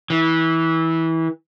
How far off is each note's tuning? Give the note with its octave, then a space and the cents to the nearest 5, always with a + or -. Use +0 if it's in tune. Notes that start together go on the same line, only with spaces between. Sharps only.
E3 -20